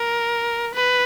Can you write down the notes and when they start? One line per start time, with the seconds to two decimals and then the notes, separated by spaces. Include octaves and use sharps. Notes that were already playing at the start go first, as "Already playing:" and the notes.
Already playing: A#4
0.75 B4